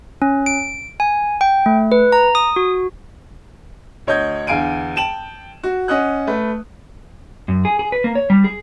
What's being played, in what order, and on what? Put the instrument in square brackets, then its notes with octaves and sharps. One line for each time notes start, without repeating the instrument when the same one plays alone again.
[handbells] C#4
D7
G#5
G5
A3
B4
A#5
D#6
F#4
[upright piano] D2 C#5 D#5 G6 G#6
E2 D3 F5 G#5 D7 D#7
G5 A5 E7 F#7
F#4
C#4 D#5 F#5 D#6 F#6
A3 B4
[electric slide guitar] F#2
G#4
G#4
B4
A#3
C#5
G3
G#4